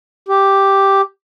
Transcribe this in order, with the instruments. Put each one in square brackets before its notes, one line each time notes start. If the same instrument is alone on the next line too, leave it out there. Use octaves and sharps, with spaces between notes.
[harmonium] G4